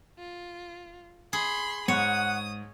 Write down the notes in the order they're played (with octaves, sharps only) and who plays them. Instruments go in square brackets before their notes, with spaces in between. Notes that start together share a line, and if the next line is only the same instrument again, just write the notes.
[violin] F4
[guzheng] G#4 [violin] B5 C6
[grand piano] G#2 [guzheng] C#5 [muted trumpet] F#5 [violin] D#6